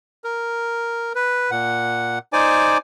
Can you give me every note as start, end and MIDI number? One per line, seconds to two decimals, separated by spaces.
0.24 1.13 70
1.15 1.51 71
1.51 2.19 46
1.51 2.19 78
2.33 2.78 63
2.33 2.78 72
2.33 2.78 74
2.33 2.78 80
2.33 2.78 86